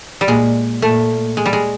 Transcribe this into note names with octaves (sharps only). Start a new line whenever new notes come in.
G3
A#2 G#3
A#2 A3
G#3
G3
G#3